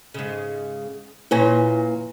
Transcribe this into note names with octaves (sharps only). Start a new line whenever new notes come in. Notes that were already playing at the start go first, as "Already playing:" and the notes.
G#2 C#3
A#2 C#4 E4 B4 G#5